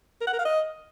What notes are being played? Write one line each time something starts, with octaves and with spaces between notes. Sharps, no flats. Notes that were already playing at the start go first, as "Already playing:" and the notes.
A#4
F#5
A#4
F5
D#5